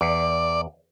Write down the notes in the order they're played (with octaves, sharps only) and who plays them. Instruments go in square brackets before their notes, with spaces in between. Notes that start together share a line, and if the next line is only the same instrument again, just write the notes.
[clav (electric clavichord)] E2 [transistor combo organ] D5